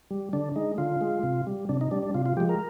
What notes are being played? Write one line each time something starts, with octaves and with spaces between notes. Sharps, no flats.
G3
D3 D4
G#3 D#4
D3 F4
G#3
C3
G3
C3 D4
D#4
G3 D4
D4
C3 F4
F4
F3 G#3 G4
A#4